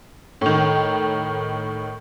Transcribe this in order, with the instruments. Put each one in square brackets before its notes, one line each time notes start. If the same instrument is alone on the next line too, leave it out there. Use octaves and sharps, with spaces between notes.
[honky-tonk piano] A2 D#3